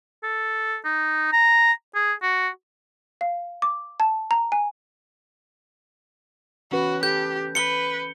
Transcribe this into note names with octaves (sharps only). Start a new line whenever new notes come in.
A4
D#4
A#5
G#4
F#4
F5
D6
A5
A#5
G#5
E3 C#4 F#4 B4
G4 A4 G6
B4 C#7 G7